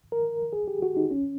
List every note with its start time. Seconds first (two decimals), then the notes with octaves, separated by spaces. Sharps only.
0.12 A#4
0.53 G#4
0.68 G4
0.82 F#4
0.97 D#4
1.11 C#4